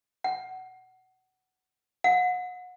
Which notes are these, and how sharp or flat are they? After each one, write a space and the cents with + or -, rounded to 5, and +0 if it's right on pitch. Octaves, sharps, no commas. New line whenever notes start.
F#5 +15
F#5 -30